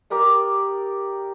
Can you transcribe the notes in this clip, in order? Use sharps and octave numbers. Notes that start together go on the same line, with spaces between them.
G4 A#4 D5 D#6